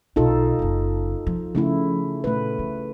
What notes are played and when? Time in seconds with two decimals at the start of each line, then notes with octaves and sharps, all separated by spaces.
0.16 B1 B2 D#4 F4 A4
0.59 F#1 C#3
1.27 F3
1.55 C#3 A3 E4
2.24 A#2 A3 B4
2.59 E3